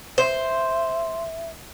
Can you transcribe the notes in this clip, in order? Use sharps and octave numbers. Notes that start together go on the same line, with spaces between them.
C5 E5